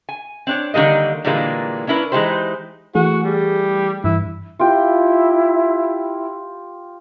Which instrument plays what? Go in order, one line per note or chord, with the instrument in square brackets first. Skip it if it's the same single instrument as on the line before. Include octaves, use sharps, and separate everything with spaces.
[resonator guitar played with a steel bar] G#5
C4 D4 C#5
D3 D#3 G3 A#3 D#5
A#2 D3 E3 G3 G#3 A#3
C#4 D4 E4 A#4 B4
E3 G#3 C#4 D#4 G4 C5
[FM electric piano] E3 A3 G#4 [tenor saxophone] F#4
[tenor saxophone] G3
[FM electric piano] G2 E3 [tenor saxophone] E4
[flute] E4 [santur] F4 G4 G5